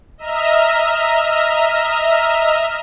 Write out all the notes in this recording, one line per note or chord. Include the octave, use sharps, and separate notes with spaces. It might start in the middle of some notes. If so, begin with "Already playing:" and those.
D#5 E5 A#5 F6